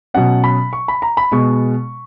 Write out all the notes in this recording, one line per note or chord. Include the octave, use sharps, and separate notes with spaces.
B2 F#3 C#4 F#5
B5
C#6
B5
A#5
B5
B2 G#3 B3 C#6